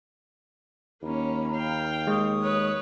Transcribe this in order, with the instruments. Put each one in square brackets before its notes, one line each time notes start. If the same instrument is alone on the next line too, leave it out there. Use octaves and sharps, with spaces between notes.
[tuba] D#2 [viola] A#3 C#4 [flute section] A#5 B5
[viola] F5 G5
[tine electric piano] G#3 [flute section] C#6 D#6
[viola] B4 C#5